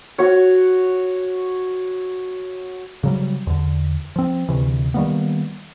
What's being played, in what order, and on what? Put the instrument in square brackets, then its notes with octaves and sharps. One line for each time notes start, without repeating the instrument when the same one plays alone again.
[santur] F#4 C#5
[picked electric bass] C#3 F#3 G3
E2 D3
F3 C4
D2 C3 E3
D#3 G3 A#3 B3